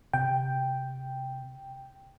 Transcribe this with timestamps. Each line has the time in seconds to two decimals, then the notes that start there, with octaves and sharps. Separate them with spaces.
0.13 C3 G5